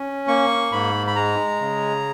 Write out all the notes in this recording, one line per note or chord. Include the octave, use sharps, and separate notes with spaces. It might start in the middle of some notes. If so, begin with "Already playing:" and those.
Already playing: C#4
A#3 C#6
G#2 B5
B5
G#3 A#5
C#3